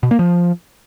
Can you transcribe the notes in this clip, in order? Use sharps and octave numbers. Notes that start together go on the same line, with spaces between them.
B2
A#3
F3